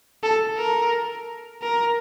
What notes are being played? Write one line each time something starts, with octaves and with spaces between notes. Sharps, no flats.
A4
A#4
A#4